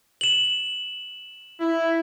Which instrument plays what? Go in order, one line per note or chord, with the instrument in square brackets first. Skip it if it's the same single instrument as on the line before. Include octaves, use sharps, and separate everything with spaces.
[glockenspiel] E7 F#7
[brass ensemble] E4